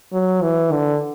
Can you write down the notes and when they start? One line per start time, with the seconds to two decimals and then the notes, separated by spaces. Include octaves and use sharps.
0.13 F#3
0.42 E3
0.72 D3